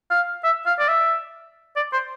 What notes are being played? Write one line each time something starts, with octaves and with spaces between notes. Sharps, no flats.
F5
E5
F5
D5
E5
D5
C5